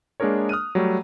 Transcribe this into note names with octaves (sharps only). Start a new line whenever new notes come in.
G#3 A#3 D4 G#4 A#4 C#5
D#6 F6 F#6 D#7
F#3 G3 A3